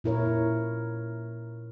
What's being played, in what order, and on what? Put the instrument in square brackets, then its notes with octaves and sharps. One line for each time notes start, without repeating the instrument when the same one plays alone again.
[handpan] A#2 E4 A#4 C#5